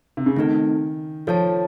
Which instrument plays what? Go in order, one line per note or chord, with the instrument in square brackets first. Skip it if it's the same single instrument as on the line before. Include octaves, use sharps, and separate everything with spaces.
[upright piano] C3
C#3
[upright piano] D#3 [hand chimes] A3 C4 D#4 A4
[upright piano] F3 [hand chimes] F4 A4 C#5 A5